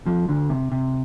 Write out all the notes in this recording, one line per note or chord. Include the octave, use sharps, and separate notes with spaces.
F2 F3
D2 D3
C3
C3